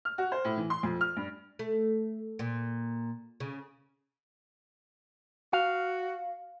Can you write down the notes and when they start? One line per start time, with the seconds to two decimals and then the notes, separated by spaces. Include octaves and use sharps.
0.05 F6
0.18 F#4
0.32 C5
0.45 A2
0.58 E3
0.70 C6
0.83 F2
1.01 F6
1.16 G2
1.59 A3
2.39 A#2
3.40 C#3
5.53 F#4 F5